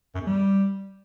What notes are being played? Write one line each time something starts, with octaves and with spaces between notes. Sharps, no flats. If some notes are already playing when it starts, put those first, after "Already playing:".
F#2
E2
G3